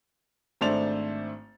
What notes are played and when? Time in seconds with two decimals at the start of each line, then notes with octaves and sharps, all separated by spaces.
0.61 G#1 A3 D4 C5 A6 F7